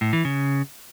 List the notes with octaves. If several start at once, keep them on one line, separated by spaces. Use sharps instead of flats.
A2
E3
C#3